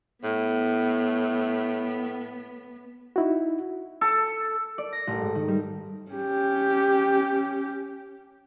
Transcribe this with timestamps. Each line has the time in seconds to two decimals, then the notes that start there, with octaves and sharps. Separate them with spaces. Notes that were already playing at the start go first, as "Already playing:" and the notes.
0.24 A2 B3
3.16 D#4 E4 F#4
4.01 A4
4.78 D5
4.92 A#6
5.07 A1
5.22 G#2
5.35 D#3
5.48 G3
6.11 C#4 G4